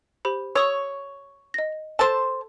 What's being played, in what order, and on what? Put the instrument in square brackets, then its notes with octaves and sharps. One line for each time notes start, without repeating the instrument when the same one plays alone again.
[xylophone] G4 C5 B5
[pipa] C#5 [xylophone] C#6 D#6 E6
[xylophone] D#5 A#6
[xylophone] A4 C6 E6 [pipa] C5 A5